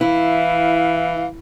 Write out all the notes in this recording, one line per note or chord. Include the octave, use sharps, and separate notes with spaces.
E3 E4 F5